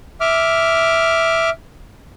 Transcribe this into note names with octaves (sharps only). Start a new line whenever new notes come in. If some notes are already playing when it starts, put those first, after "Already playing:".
E5 D6 F6